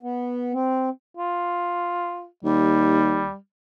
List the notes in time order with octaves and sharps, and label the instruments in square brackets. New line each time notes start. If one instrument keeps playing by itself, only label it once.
[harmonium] B3
C4
[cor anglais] F4
[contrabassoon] D#2 [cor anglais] G3